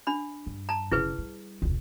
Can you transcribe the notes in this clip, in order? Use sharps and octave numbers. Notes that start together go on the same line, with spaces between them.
D4 B5
G2
A5 A#5
F#1 C#3 E4 G#4 B4
G3
E1 C#2